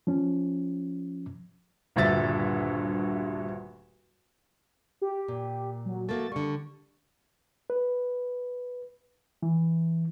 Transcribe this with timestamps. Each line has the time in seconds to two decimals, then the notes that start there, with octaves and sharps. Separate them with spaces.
0.07 F3 C#4
1.96 D#1 D2 G2 E5 A6
5.02 G4
5.28 A#2
5.86 F#3
6.09 A3 A#3 F#4 A6
6.32 D3 G3 C#6
7.70 B4
9.43 E3